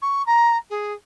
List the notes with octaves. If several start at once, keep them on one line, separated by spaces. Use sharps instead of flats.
C#6
A#5
G#4